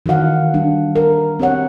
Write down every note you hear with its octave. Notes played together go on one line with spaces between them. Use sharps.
D#3 E3 F#4 F5 F#5
G3 D4
A#4
C4 G4 C#5 F#5